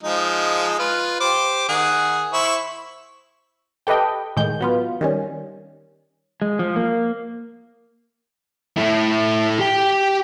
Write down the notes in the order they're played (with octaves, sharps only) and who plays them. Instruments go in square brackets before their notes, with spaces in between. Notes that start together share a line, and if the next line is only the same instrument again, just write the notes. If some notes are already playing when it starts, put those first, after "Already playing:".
[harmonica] F3 G#3 D#4
F4 B4
G4 C5 D6
D#3 G#4 F#5
E4 C5 C#6
[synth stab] G4 A4 B4 D#5 G5
A2 D#3 G#3 G6
F#3 B3 F4
D#3 G3 C#4
[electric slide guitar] G#3
F3
A#3
[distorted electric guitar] A3 E4
G4 G5